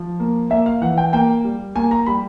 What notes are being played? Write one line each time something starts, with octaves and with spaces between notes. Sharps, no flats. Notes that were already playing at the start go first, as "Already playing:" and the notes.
Already playing: F3
A#3
A#3 E5
F5
E3 F#5
G5
A#3 G5
G3
A#3 G#5
A#5
G3 B5